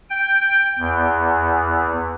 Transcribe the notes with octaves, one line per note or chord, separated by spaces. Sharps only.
G5
E2